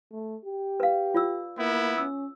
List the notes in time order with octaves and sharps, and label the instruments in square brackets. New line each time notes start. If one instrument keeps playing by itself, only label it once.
[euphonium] A3
G4
[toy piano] B4 F5
F4 D5 E6
[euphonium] A#3 [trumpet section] B3 E4
[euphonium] C#4 [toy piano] E6